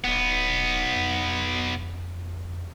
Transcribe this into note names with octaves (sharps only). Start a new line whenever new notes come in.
D1 B1 B3
F2